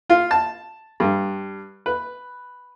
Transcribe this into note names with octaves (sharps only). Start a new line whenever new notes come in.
F4
A5
G2
B4